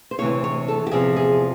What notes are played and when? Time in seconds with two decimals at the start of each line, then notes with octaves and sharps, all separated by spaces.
0.11 C5
0.19 D2 C3 E3 C#5
0.44 C#5
0.68 A4
0.87 G4
0.91 E2 C3 F3 G#4
1.16 G#4